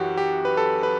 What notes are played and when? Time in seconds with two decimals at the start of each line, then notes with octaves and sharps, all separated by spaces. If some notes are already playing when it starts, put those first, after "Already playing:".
Already playing: F#2 E3 F#4 G4
0.17 G4
0.45 B4
0.57 A4
0.83 B4